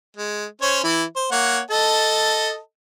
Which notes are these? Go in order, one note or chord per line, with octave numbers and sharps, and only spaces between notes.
G#3
C#4 C5 C#5
E3 E4
C5
A#3 C#5 F#5
A4 D#5 A5